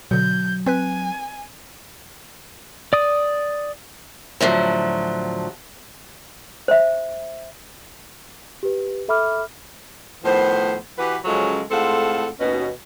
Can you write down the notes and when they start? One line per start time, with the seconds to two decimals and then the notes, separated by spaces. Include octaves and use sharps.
0.11 B2 D3 F#3 G6
0.66 C4 B4 G#5 F#6
2.93 D5 D#6
4.41 A2 D3 F3 F#3
6.68 C5 E5
8.63 G4 B4
9.08 A4 E5 B5 D6 F6
10.24 A2 D#3 F3 B3 C5
10.97 E3 F#4 G4 B4
11.25 C#3 F3 F#3 G#3 C#4 A4
11.70 A2 G#3 C4 F4 A4 F#5
12.39 D#2 B2 C#4